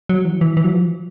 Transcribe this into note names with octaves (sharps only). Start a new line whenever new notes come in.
F#3
E3
E3
E3
F#3
F3